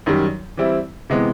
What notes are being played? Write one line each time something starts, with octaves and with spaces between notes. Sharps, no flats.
F#2 D#3 G3
E3 G3 C4 E4
C3 E3 G#3 B3